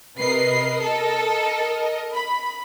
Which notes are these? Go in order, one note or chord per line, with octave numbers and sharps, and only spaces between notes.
C3 A#4 B4 D#5 C7
A4
B5